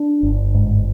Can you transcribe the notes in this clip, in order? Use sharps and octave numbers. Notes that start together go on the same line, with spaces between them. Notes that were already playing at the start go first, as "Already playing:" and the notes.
Already playing: D4
G1
G#2